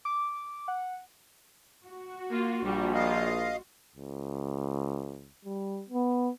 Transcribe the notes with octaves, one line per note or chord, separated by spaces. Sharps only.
D6
F#5
F#4
A#3 F4
A#1 G3
F4 D#5 F5
C#2
G3
B3